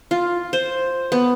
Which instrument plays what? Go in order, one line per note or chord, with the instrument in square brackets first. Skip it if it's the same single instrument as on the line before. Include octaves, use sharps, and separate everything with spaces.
[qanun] F4
C5
B3